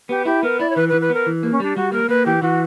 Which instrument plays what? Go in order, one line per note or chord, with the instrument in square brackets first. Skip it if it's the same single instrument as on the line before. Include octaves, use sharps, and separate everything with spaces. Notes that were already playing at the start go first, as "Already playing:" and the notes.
[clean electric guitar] B3 [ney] G4
[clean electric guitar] E4 [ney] G4
[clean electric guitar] B3 [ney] A#4
[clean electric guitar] E4 [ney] D5
[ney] C#5
[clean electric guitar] E3 [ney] B4
[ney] B4
[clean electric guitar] E3
[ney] B4
[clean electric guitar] B3 [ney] A#4
[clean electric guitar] E3
A#3
[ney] C#4
[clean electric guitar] G3 [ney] D4
[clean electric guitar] G3 [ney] F#4
[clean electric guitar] A#3 [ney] A#4
[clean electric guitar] A#3 [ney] B4
[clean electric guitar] E3 [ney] G4
[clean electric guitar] E3 [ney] F#4